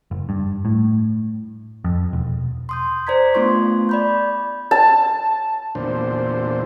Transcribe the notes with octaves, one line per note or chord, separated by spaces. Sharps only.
F#1
G2
A2
F2
E1
C6 D#6 G6
C5 D5 A#5 G#6 B6
A3 B3 D4 F4 C6 C#6
D5 B5 G6
A5
E2 A#2 D3 D4 C5